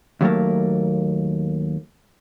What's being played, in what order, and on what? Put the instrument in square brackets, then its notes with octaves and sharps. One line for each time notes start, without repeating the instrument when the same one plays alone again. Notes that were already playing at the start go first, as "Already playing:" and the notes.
[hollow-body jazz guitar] D#2 F#3 A3 A#3